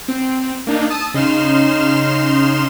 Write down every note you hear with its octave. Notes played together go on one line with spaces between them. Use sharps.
C4
A#3 D4 D#4
A5 D#6 E6
C#3 D#4 C6 F6 E7